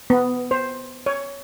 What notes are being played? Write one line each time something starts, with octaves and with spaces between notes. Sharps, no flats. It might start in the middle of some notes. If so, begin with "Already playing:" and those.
B3
C5
C#5